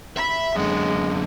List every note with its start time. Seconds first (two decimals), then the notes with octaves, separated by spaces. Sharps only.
0.17 E5 B5
0.56 F#2 D3 G#3